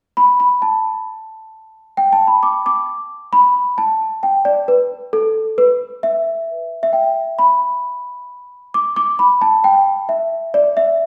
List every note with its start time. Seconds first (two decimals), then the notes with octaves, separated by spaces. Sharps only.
0.17 B5
0.40 B5
0.62 A5
1.97 G5
2.13 A5
2.27 B5
2.43 D6
2.66 D6
3.33 B5
3.78 A5
4.23 G5
4.45 D5
4.68 B4
5.13 A4
5.58 B4
6.03 E5
6.83 E5
6.93 G5
7.39 B5
8.74 D6
8.96 D6
9.19 B5
9.42 A5
9.64 G5
10.09 E5
10.54 D5
10.77 E5